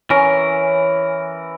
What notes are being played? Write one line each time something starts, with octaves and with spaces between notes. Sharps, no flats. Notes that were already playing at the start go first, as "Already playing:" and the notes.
E3 C#4 A#4